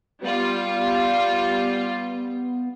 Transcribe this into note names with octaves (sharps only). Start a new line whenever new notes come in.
G3 B3 F4